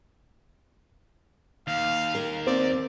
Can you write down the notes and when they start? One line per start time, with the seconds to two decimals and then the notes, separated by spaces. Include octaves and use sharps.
1.67 D#2 F5
2.15 A#4
2.47 C4 D5